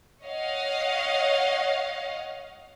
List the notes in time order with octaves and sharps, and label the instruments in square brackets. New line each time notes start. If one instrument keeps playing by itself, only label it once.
[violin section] C#5 D#5 F5 F#5